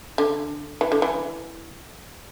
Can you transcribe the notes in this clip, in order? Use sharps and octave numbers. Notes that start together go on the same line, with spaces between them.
D3
E3
D3
E3